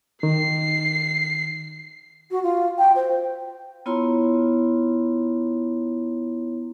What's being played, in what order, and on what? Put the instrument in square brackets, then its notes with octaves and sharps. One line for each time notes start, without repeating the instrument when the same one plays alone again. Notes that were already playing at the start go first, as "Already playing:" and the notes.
[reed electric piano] D#3 [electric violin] C7
[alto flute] F#4
F4
G5
C5
[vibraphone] B3 E4 F4 C#5 A#5 C6